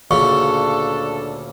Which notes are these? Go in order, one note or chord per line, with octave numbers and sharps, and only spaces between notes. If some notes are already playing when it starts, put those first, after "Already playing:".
D2 A#2 C#3 D4 A4 C#6